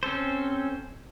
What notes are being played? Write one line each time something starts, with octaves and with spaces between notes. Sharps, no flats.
C4 C#4 A4 C5